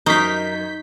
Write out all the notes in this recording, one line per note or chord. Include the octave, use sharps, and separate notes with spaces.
F#2 D#4 A#4 C#6 G6 B6 C7